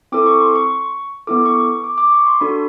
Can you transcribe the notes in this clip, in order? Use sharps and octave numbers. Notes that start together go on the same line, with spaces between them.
C4 E4 A4 D6
C#6
C6
C#6
B3 E4 A4 D6
C#6
D6
D6
C#6
C6
D4 F#4 A4 B5